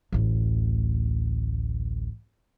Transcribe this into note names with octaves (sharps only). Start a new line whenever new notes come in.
A1 D2